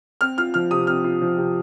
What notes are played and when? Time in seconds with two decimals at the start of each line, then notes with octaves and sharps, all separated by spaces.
0.21 C4 F6
0.38 F4 F6
0.54 F3 F6
0.71 C3 D#6
0.87 C4 F6
1.04 F4
1.22 F3
1.38 C3